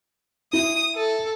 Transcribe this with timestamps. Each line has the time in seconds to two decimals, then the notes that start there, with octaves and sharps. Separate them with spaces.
0.53 E4 D#6
0.96 A4